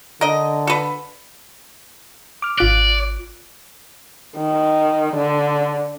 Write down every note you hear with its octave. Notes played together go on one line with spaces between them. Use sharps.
D3 A#4 D#5
A4 B4
D6 F6
G#1 F4 D5 F#6
D#3
D3